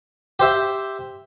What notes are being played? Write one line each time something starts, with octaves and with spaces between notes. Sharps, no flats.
G4 C5 E5